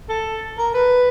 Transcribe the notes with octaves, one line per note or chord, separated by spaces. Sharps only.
A4
A#4
B4